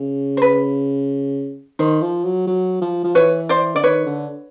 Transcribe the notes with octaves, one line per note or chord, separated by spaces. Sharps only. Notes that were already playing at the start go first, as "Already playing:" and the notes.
Already playing: C#3
C5
B4
D#3 C5
F3
F#3
F#3
F3
F3
E3 B4 C#5
C5 D5
D3 D5
D#3 B4 C#5
D3